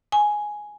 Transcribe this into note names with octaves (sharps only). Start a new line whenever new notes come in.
G#5